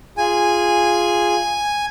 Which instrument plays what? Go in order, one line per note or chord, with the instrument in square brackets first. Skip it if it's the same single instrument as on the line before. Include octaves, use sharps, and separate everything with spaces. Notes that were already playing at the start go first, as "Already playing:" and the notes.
[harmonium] F4 G#4 [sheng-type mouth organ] G#5